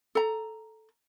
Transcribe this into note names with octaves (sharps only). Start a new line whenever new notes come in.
A4 A#5